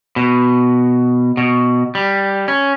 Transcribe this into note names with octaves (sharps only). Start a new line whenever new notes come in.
B2
B2
G3
C#4